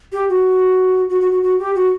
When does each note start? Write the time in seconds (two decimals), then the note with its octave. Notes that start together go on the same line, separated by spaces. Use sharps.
0.12 G4
0.29 F#4
1.10 F#4
1.21 F#4
1.31 F#4
1.43 F#4
1.59 G4
1.75 F#4